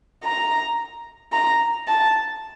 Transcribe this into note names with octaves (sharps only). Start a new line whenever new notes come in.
A#5
A#5
A5